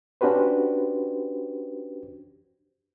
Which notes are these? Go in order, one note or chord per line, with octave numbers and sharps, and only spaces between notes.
C#4 D4 F#4 G4 B4 C5